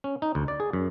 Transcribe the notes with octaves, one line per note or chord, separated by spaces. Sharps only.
C#4
D#4
D2
D5
G#4
F#2